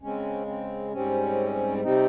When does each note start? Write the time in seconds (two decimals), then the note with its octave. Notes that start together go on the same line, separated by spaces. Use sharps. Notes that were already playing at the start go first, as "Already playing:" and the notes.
0.02 C#3 G#3 C4 C#4
0.47 C4
0.92 G#2 G3 C4 C#4
1.83 C3 G3 C4 D#4